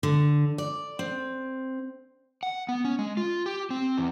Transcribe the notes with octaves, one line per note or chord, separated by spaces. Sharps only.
D3
D5
C4
F#5
B3
C#4
G#3
F4
G4
C4
E2